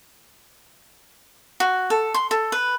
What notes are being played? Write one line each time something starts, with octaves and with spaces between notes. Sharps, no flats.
F#4
A4
C6
A4
B4